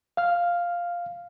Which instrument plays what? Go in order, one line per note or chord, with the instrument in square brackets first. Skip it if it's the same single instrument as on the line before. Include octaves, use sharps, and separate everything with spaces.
[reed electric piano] F5 F6